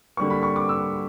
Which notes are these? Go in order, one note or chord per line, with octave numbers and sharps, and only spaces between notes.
D3 G3 A#3 C#6
B5
C#6
D6
E6